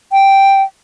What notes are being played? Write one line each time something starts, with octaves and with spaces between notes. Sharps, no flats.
G5